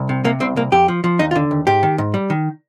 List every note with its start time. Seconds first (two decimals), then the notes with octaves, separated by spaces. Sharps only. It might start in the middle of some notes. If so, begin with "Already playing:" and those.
Already playing: C2
0.09 C3
0.24 C3 A#3
0.40 C2 C4
0.56 C2 A#3
0.72 F2 G4
0.88 F3
1.04 F3
1.19 D#2 D#4
1.31 F4
1.36 D3
1.51 D#2
1.67 G#2 G4
1.83 D#3
1.98 G#2
2.14 G3
2.30 D#3